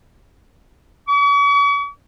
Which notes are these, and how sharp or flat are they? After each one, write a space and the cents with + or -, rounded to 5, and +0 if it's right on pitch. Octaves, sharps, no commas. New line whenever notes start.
C#6 +45